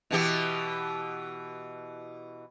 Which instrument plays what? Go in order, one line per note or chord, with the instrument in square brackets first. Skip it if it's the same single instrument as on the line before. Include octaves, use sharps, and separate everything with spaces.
[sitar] B2 E3 G4